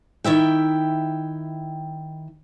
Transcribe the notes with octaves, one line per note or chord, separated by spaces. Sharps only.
D#3 E4 E5 G5